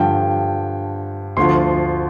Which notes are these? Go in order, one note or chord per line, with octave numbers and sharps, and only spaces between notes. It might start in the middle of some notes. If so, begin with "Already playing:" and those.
Already playing: G2 D3 F3 G5
D2 D3 F3 C6